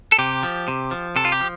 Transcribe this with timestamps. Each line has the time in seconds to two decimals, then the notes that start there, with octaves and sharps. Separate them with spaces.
0.12 A4
0.18 C3 G4
0.43 F3
0.68 C3
0.91 F3
1.16 C3 A4
1.25 F4
1.32 G4
1.41 F3